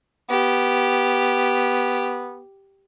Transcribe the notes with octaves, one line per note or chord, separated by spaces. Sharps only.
B3 G4